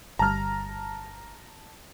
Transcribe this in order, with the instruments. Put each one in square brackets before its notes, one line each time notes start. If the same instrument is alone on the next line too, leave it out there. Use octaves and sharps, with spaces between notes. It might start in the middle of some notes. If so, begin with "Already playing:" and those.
[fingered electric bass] G1 G3 [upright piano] A5 F6 [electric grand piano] A#5